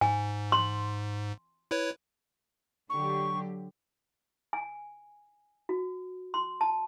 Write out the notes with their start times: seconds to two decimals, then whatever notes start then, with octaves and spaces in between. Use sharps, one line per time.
0.01 G#2 G#5
0.52 C6
1.71 E4 B4 C#5
2.90 D3 F#3 G4 C#6
4.53 G#5
5.69 F#4
6.34 C6
6.61 A5